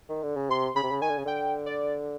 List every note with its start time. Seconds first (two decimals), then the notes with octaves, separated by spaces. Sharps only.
0.09 D#3
0.23 D3
0.36 C#3
0.50 C3 C6
0.76 C#3 B5
0.83 C3
0.92 C#3
1.01 D#3 G#5
1.09 D3
1.18 C#3
1.26 D3 G5
1.66 D5